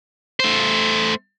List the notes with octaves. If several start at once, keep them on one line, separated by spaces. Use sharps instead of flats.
A3 C5